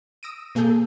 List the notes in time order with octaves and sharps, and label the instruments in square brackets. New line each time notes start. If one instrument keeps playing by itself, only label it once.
[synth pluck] D#6 E6 A#6 D7 D#7
B2 A#3 G#4 A4 G6